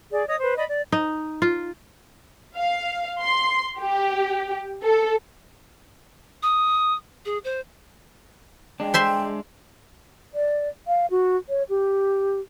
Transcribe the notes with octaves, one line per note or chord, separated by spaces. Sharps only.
G#4 D5
C#5 D#5 D#6
B4 C5
D5 D#5 B5
D5
D#4
F4
F5
C6
G4
A4
D#6
G#4
C5
G#3 D4 G5
C5 E5 C6
D5
F5
F#4
C#5
G4